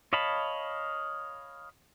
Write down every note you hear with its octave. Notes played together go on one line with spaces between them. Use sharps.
C#5 D#5 F5 A5 B5